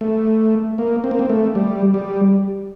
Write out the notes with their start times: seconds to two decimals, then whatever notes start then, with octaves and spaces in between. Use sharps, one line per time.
0.01 A3
0.78 A#3
1.04 C4
1.11 A#3
1.19 C4
1.30 A3
1.55 G3
1.94 G3